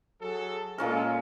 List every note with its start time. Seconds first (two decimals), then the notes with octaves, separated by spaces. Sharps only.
0.22 F#3 G#4 A4
0.78 A#2 G#3 C#4 F4 A4 A#4